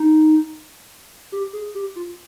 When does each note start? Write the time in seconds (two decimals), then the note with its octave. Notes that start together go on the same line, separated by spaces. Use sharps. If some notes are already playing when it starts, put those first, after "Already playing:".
Already playing: D#4
1.32 G4
1.53 G#4
1.75 G4
1.96 F4